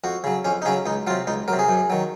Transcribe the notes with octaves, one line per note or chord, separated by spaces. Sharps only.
F2 F#4
C#3 F#3
F2 C#4
D#4
C#3 F#3 C#4
C#2 D#4
C3 F#3 F4
C#2 D#4
F#3 A#4
C3
G#4
F#2
D#3 F#3